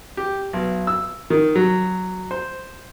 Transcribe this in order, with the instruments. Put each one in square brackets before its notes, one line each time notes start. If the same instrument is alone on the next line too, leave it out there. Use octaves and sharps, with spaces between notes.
[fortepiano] G4
B1
E6
D#3
F#3
C5